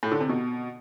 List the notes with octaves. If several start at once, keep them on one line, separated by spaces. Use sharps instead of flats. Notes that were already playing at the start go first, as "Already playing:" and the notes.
A2
D3
C3
B2